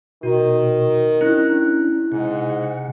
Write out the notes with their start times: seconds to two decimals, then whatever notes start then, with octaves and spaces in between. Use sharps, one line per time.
0.23 B2 D#3 F#4
1.21 C#4 D4 E4 F#6
2.12 G#2 C3 F#5